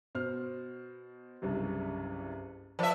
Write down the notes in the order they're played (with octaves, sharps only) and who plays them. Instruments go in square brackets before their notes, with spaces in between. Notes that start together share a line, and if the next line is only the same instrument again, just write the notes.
[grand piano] B2 C5 F6
F#1 C2 G2
[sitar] F3 E5 [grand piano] B4 D5